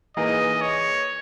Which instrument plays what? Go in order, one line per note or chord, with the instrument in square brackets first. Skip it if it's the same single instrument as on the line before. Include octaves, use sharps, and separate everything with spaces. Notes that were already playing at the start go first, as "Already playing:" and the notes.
[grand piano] E3 A#3 D#4 G#4 [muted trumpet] D#5
[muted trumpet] C#5